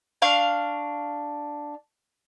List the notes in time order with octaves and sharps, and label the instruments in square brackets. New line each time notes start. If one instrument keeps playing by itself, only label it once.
[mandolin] D4 F5 C#6